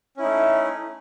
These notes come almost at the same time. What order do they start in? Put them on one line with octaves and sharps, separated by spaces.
C#4 E4 D#4 A3